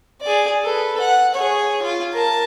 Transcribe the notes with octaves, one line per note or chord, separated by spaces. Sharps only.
G#4 D5
A4 B4
F#5
G#4 C#5
F4
A#4 A5